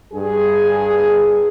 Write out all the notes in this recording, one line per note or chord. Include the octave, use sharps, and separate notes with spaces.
G2 G#4